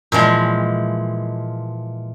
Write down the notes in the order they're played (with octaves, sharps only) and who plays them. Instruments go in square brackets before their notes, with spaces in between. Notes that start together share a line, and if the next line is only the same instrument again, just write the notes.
[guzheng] A#2 E3 F3 G#3